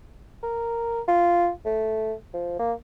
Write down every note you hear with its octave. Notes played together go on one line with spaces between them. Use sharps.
A#4
F4
A3
F3
A#3